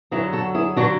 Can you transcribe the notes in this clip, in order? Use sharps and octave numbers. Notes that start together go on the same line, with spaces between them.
F#2 D3 F#3 E4 G#4
F#4 A4
E4 G#4
D3 F#3 D4 F#4